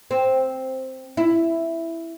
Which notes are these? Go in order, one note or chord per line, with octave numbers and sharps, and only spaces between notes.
C4
E4